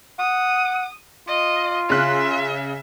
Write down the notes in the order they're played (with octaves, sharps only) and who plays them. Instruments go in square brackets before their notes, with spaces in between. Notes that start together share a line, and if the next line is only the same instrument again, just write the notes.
[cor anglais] F#5 [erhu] D#6
[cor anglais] F4 [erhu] D#5
[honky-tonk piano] C#3 F#6 [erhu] E5